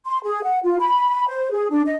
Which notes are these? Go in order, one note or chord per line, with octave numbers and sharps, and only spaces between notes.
C6
G#4
F#5
F4
B5
C5
G#4
D4
D#5